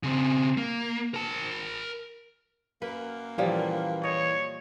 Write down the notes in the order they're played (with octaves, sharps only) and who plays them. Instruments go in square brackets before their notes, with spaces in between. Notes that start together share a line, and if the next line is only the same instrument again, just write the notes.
[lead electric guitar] C#3 C4
A#3
A#4 A5
[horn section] F#2 A#3 [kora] B4
[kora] A#2 F3 G3 [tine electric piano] E3
[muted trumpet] C#5 [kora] D#5